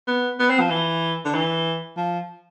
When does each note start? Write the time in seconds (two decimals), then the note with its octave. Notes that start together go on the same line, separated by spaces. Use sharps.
0.08 B3
0.39 B3
0.50 C4
0.60 F3
0.70 E3
1.25 D3
1.34 E3
1.97 F3